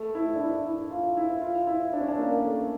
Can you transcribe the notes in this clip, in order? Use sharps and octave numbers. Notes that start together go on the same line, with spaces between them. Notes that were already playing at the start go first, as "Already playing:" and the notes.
Already playing: A3
E4
D4
E4
E4
F4
E4
F4
E4
D4
C#4
D4
A#3
A3